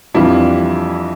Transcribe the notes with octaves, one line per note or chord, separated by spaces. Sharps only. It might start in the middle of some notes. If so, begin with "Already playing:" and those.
F2 E3 G3 D4 E4 F4